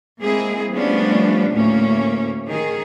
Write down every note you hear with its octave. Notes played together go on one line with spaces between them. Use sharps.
G#3 A#3 C4 E4 G#4
F3 G3 A3 B3 C#4 D4
D2 A2 A3 A#3 C#4
D#3 G#4